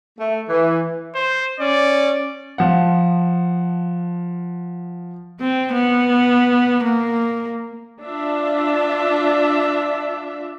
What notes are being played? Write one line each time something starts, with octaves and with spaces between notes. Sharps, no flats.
A3
E3
C5
C#4 D5
F3 F5 F#5
C4
B3
A#3
D4 F4 E5